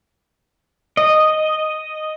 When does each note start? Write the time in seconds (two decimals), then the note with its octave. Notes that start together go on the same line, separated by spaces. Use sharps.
0.97 D#5